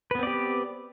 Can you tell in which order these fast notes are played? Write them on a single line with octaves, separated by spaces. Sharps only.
B4 B3 C4 D5 G4